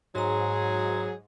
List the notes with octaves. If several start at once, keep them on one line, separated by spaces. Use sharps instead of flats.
G#2 F#3 G#4 A#5 C6